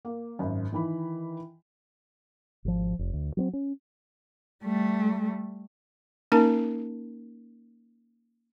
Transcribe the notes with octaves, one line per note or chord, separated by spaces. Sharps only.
A#3
G#1 F#2
D#3 E3 B5
G#1 F3
F1
D2
F#3 A#3 C4
C#4
G3 A3
A#3 C#4 D#4 A#4 A5